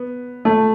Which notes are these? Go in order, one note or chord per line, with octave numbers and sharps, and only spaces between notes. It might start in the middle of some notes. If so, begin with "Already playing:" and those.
Already playing: B3
A3